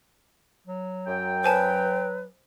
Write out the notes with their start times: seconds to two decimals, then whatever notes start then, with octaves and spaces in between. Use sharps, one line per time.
0.67 F#3
1.07 F#2 G5
1.44 B4 C5 G#5 A5